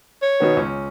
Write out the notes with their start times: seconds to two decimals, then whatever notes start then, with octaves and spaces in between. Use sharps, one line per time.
0.22 C#5
0.40 B2 D#3 B3
0.57 C#2 C#4